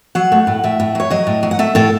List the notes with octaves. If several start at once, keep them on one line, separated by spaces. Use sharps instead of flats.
F#3 F#5
A3
A2
A2 E5
A2
F#3 C#5
F#3 D#5
A2
F#3
F#5
A3 E5
A2 A4